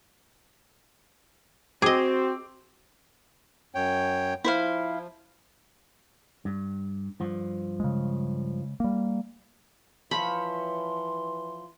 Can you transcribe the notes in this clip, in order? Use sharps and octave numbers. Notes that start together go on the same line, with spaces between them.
C4 F#4 G#4 D#5 D6
F#2 C#5 G5
F3 E4 C5 F5
G2
G2 F3
C#3 G#3
G3 A#3
E3 F3 C#5 E5 B5 C6